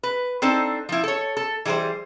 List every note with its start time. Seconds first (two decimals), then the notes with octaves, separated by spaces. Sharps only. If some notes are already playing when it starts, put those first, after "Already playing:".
0.03 B4
0.42 C4 D4 D#4 A4 C5
0.89 F3 E4
1.04 A4 C#5
1.37 A4
1.65 E3 G3 G#4 A4 C5